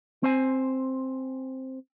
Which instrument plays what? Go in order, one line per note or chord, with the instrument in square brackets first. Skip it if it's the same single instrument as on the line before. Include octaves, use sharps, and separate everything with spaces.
[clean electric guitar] C4 C5 G#5